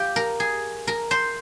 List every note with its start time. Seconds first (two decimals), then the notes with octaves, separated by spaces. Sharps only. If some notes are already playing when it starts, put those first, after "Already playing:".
Already playing: F4 G4
0.16 A#4
0.40 G#4
0.87 A#4
1.11 C5